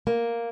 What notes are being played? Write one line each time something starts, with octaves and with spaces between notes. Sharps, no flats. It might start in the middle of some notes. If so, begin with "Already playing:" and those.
A#3